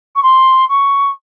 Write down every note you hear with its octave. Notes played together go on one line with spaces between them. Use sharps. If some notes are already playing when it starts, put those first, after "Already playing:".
C#6
C6
C#6